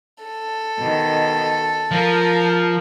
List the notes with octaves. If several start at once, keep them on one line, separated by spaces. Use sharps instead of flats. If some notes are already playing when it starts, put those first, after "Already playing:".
A4
B2 D#3
F3 A#4